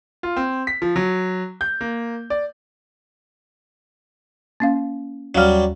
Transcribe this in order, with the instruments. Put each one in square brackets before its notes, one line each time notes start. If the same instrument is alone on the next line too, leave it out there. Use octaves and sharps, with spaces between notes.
[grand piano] F4
C4
B6
F3
F#3
G6
A#3
D5
[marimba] A#3 C#4 F5
[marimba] D#2 F5 F6 [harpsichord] F#3 G3